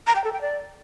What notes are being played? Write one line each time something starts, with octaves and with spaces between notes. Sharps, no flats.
A#5
G5
A4
G5
D5